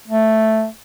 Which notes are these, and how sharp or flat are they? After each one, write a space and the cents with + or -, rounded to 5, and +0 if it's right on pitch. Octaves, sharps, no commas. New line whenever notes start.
A3 +0